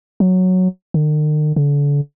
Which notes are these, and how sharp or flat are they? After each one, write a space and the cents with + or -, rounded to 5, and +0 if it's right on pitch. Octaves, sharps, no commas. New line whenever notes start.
F#3 -5
D#3 -45
D3 -35